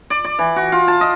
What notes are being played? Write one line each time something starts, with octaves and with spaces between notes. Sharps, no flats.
D5
D5
E3
F#4
F4
A5
D#5